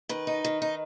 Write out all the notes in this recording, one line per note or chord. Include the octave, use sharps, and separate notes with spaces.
D#3 B4
D#4
D#3
D#4